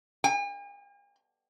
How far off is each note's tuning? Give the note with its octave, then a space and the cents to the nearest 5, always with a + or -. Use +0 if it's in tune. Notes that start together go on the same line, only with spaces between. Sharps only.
G#5 -45